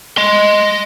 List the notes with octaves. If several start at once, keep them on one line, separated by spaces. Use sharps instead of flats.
D#5 C6